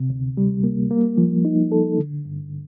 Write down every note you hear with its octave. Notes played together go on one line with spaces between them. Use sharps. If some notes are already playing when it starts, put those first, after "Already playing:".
Already playing: C3
D2
G3
A#3
A#3
F3
D#4
A4
D3
G2